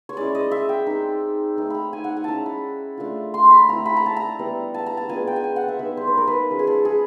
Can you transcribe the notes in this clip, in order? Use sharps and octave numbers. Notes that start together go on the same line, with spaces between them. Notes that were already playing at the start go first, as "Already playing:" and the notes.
C#5
G#3 C#4 E4 D5
D#5
E5
G5
G#3 C4 D#4
A3 C4 D#4
A#5 B5
G#5
F#5
G#5
G#3 C#4 E4 A5 A#5
B5
A3 D4 F4
C6
B5
A3 C4 E4 A#5
B5
A#5
A5
A#5
G3 B3 E4
A5
A#5
A5
G#3 B3 D4 F4 G#5
G5
G#5
G5
F#5
E5
G3 B3 D#4 E5
C5
B4
A#4
B4
F3 G#3 C#4
G#4
A4
G#4